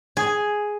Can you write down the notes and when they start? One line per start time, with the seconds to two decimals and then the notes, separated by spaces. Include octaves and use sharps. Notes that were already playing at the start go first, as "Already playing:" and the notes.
0.17 G#4